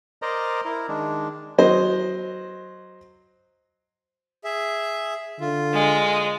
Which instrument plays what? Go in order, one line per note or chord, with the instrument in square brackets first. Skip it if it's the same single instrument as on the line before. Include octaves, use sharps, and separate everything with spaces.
[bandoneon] A#4 C5 D5 D#5 A#5
E4 A#4
D#3 G#3 D4
[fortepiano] F#3 C5 D#5
[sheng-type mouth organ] G#4 E5
[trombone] D3 [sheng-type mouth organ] F4
[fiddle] G#3